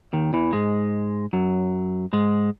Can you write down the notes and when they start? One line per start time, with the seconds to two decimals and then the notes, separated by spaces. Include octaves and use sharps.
0.13 D#2 D#3
0.33 E2 E3
0.53 G#2 G#3
1.33 F#2 F#3
2.13 G#2 G#3